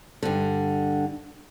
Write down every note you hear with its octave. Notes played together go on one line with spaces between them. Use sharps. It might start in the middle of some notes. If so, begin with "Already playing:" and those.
G2 D3